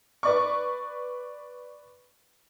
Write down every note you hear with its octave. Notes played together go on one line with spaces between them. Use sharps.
B4 D5 C#6